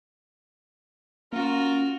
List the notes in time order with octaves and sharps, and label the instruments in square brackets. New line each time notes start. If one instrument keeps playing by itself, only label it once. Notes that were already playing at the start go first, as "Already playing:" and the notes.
[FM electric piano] A#3 [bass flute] C#4 [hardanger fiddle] F4 F#4 [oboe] A#4